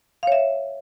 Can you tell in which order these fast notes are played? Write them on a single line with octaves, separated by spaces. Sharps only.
F5 C#5 E5